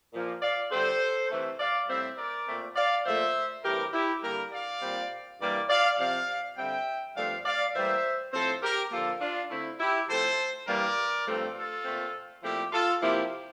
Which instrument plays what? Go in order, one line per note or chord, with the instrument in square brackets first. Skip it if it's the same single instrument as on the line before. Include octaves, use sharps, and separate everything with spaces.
[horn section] A#2 F3 A#3
D5 F5
D3 G3 C4 A4 C5
C3 E3 A3
D5 F5
A2 G3 C4 C5 E5
A#4 D5
A#2 A3 C4
D5 F5
A#2 F3 A3 C5 E5
G2 E3 A3 C4 G4 A#4
E4 G4
D3 G3 A#3 G4 A#4
D5 F5
A#2 G3 C4
G2 E3 G3 A#3 A#4 D5
D5 F5
C3 F3 C4 D5 F5
D3 G3 C4 E5 G5
G2 F3 A3 C4 D5 F5
D5 F5
A2 E3 G3 A#3 C5 E5
A2 F3 C4 A4 C5
G4 A#4
D3 F3 A#3 F4 A4
D4 F4
D3 A3 C4 E4
E4 G4
A2 F3 A3 C4 A4 C5
G2 E3 G3 A#3 A#4 D5
G2 F3 A3 C4
F4 A4
A#2 A3 C4
A#2 F3 A3 C4 E4 G4
F4 A4
C3 F3 A#3 E4 G4